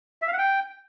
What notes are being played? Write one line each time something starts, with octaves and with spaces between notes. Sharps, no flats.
E5
F5
F#5
G5